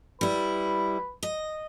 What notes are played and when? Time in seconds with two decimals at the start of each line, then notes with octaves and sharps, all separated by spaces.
0.21 G3 E4 B4
1.23 D#5